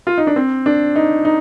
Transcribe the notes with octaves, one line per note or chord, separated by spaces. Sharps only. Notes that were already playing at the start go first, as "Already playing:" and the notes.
F4
D#4
D4
C4
D4
D#4
D#4